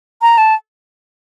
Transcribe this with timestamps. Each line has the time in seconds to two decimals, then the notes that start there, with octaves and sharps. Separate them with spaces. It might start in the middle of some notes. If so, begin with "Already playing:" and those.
0.22 A#5
0.38 A5